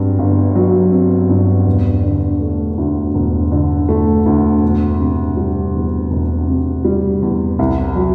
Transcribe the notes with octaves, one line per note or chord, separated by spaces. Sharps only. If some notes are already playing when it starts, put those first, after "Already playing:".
Already playing: G1 G2 F#3 C4
G1
F#3
C4
G2
E1
D3
A3
D2
E1
D3
A3
D2
E1
C3
G3
E2
E1
C3
G3
E2
C2
F#3